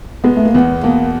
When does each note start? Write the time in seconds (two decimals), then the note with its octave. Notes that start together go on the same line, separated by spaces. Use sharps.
0.24 G#3 B3
0.36 A3
0.45 A#3
0.54 E2 B3
0.83 B2 A#3